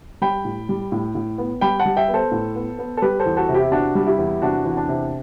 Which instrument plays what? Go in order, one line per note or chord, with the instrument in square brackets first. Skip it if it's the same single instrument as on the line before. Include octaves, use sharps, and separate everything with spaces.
[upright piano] G3 G5 B5
A2
G3
A2
A2
B3
G3 G5 B5
F#5 A5
G3
E5 G5
B3
A4 C5
A2
B3
B3
A4
G3 G4 B4
A4 C5
E2
F#4 A4
C3
E4 G4
C3 D4 F#4
G3
E4 G4
E2
C3 D4 F#4
E2
D4
C3